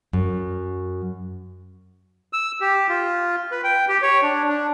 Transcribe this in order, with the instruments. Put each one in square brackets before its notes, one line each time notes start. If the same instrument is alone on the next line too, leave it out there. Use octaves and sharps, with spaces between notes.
[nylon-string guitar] F#2
[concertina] E6
G4
F4
B4
G5
G4
C#5
D4
D4